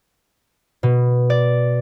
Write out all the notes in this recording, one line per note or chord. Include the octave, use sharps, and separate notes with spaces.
B2
D5